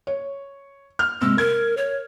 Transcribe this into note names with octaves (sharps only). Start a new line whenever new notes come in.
C#5
F6
C3 G#3 E6
A#4 G#6
C#5